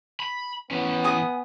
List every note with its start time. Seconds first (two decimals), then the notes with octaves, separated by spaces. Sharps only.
0.20 B5
0.71 E3 B3 C#4
1.04 G#5 D#6